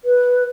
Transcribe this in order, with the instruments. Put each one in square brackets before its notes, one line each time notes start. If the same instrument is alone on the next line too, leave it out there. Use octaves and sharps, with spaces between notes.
[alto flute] B4